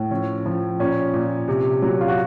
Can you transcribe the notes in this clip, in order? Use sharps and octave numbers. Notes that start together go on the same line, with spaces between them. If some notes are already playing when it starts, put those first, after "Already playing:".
Already playing: A2
F3 C#4
F3
A#2 C#4
A#2
C3
F#3
F4
F#4